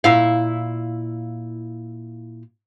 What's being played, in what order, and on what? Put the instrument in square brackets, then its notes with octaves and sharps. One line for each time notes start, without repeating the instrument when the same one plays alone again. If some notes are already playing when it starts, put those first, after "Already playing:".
[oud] A#2 E4 F5